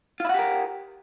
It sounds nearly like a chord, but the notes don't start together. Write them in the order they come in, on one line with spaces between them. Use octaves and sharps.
F4 E4 F#5 G4 A#4